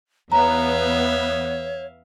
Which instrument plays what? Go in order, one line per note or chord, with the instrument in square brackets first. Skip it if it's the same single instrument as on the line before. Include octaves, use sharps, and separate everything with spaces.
[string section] E2 B3 [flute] C#5 [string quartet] E5 F5 [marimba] A#5